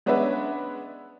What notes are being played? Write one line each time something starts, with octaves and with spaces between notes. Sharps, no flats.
G#3 B3 C#4 D4 B4 E5